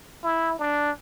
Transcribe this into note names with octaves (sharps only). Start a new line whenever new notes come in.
E4
D4